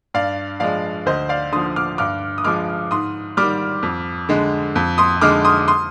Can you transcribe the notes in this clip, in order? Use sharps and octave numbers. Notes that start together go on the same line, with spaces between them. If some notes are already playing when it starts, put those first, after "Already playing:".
G2 D5 F5
F3 G#3 D5 F5
D2 C5 D#5
D5 F5
D3 F3 C6 D#6
D6 F6
G2 D6 F6
D#6
F3 G#3 D6 F6
G#2 C6 D#6
D#3 G3 D6 F6
F2
D3 G#3
F2
C6 D#6
D3 G#3 D6 F6
C6 D#6
C6 D#6